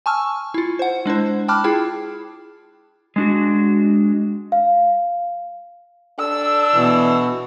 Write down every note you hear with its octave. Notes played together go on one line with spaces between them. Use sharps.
G#5 A5 C#6 E6 F6
E4 F4
C5 F#5
G#3 D4 E4 C5
G5 A5 B5 D6 F6 F#6
E4 F4 G#4 G5
G#3 D4 F#4
F5
D4 A4 E6
B2 E3